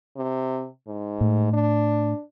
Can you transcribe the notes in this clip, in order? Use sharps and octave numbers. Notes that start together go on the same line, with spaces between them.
C3
G#2
A2
D4